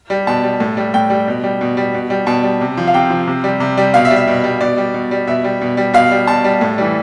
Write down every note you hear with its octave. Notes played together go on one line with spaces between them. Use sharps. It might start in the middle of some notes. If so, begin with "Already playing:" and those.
G3
B2 A5
G3
A2
G3
A2 G5
G3
B2
G3
B2
G3
B2
G3
B2 A5
G3
C3
F3
F5
C3 G5
F3
C3
G3
C3
G3
B2 F5
E5
G3
E5
B2
G3
B2 D5
G3
B2
G3
B2 E5
G3
B2
G3
B2 F5
G3
B2 A5
G3
A2
E3 G3